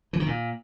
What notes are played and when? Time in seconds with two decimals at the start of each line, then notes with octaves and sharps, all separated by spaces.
0.13 E3
0.20 D#3
0.26 A#2